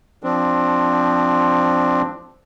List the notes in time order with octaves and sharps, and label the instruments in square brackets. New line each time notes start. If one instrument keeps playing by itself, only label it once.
[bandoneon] F3 C4 D4